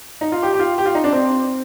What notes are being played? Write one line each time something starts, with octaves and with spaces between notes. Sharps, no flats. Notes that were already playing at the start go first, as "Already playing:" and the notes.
D#4
F4
G4
G4
F4
G4
F4
D#4
D4
C4